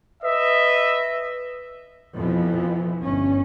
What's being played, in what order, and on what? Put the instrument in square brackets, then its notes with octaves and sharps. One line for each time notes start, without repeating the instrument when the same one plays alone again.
[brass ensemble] B4 D#5 E5
[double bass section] F2 B2 E3 F3
G1 C#4